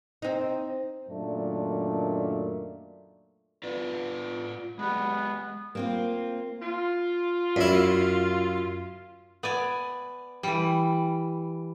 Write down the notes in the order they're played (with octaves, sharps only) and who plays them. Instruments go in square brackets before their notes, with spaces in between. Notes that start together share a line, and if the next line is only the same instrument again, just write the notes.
[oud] C4 D#4
[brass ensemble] F#2 A#2 D#3 A3 D4
[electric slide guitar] F4 B4 D5
[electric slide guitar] G#3 G4 [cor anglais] B3
[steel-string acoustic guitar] A#3 C4 F4
[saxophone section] F4
[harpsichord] F#2 E4
[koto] B3 D5 G#5
E3 G3